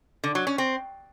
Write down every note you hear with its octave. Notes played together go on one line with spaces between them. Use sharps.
D3
F#3
C#4
C4